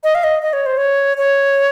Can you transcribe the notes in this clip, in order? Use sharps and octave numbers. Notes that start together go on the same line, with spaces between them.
D#5
F5
D#5
D#5
C#5
C5
C#5
C#5